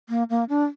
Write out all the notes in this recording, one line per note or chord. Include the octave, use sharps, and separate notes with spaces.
A#3
A#3
D4